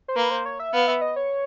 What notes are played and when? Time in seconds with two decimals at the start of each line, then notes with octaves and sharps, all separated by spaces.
0.08 C5
0.16 A#3 B4
0.31 C5
0.45 C#5
0.60 E5
0.73 B3 F5
0.87 E5
1.01 D#5
1.16 C#5